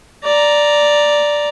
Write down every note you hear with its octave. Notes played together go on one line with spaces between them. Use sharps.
D5 A#5